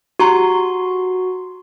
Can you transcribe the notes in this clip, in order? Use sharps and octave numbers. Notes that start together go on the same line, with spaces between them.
F#4 G4 A#5 C6